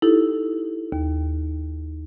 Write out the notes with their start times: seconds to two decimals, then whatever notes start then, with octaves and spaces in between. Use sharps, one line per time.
0.02 D#4 E4 G4 A4
0.92 D#2